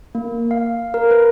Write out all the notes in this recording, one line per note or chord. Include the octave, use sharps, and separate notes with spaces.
A#3
F5
A#4
B4